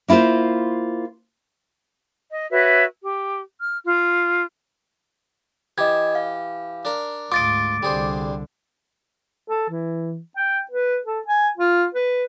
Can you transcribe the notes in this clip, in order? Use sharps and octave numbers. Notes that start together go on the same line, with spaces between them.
A#3 E4 F4 A#4 C5
D#5
F#4 B4 C#5 E5
G4
F6
F4
E3 G4 D#5 G#6
F5
D4 A#4
D2 G#2 F4 D#5 D6 A6 D7
C2 D3 G3 G#4 C5
A4
E3
G5
B4
A4
G#5
F4
B4